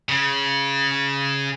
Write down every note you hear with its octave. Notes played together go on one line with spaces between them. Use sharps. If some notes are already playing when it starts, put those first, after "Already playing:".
C#3